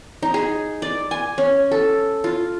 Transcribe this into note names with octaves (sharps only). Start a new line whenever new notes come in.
D#4
G#4
D5
G#5
C#4
A4
F4